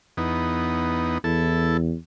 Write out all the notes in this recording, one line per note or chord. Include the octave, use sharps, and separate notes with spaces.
E2 B3 D#4
E2 E4 A4